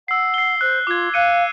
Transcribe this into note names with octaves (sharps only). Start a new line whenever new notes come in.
F#5 E6 C7
C7 G7
C5 F#6
F4 D6 G#6
F5 F#6 C#7 D#7